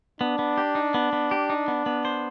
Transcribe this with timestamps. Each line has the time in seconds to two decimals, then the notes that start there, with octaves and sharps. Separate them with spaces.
0.21 B3 D4
0.39 B3
0.58 G4
0.75 D#4
0.94 B3
1.13 B3
1.31 G4
1.50 D#4
1.68 B3
1.86 B3
2.05 C5